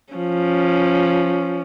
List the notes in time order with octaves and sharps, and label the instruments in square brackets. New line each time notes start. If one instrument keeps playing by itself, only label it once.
[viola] F3 C#4